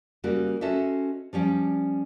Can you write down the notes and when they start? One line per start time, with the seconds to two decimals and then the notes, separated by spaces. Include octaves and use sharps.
0.24 C#3 G3 A#3 F#4
0.61 C#4 F#4 A4 C5 D#5 E5
1.33 F3 G3 C#4 D5